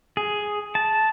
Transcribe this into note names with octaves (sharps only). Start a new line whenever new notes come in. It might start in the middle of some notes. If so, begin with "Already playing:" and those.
G#4
A5